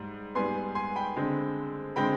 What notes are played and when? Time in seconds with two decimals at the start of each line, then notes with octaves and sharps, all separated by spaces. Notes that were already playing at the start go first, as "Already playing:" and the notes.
Already playing: G#2 G3
0.35 G#2 G3 B3 G#5 C6
0.75 G#5 C6
0.96 G5 B5
1.16 D3 G#3 C4
1.96 D3 G#3 C4 G5 B5